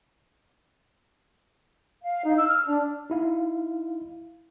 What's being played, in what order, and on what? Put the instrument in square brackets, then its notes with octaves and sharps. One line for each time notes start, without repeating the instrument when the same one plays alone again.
[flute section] F5
D#4
E6
F6
D4
[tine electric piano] D#4 E4 F5